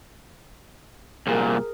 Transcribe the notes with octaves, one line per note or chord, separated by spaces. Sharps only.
C2 A#2 G#4 A#4